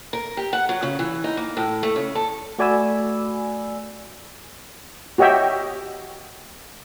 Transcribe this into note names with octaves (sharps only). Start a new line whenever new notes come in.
A#4
G4
F#5
F#3
C#3
E3
D#4
A#3
A2
A3
C#3
A4
A3 F#4 D5 G#5 B5 E6
F#4 G4 C#5 D#5 E5 G5